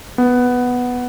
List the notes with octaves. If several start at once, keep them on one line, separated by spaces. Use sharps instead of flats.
B3